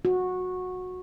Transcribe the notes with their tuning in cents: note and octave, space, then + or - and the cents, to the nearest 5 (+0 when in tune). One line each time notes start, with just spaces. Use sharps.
F#4 -15